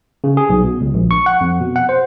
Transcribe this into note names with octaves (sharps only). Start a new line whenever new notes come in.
C#3
G#4
B1
B2
C#2
A#1
C#6
F#5
F2
B2
F#5
C5